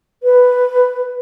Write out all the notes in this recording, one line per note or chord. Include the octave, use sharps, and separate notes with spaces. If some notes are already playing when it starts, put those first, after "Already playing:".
B4